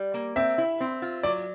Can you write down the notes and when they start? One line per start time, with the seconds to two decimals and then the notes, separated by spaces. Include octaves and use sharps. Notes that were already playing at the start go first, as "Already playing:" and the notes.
Already playing: G3
0.14 A#3
0.36 C4 E5
0.58 E4
0.80 C4
1.02 F4
1.23 F#3 D5